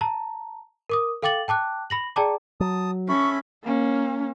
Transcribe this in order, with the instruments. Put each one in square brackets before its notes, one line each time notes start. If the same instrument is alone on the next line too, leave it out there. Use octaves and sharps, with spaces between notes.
[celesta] A5 A#5
A#4 D6 D#6
A4 F5 G5 D6 A6 F#7
G5 A5 D6 F#6
B5 A#6 F#7
G#4 D5 G5 A5 A#5 D6
[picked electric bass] F#3 [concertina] A5 D#6
[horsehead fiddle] C#4 [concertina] A4 E5 B5 [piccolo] C#6
[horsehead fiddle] A#3 C#4